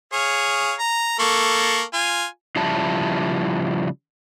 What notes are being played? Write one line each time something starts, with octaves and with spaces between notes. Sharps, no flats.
G#4 C#5 F5
A#5
A#3 A4 C#6
F4 G#5
C#3 F3 G3 E4 A5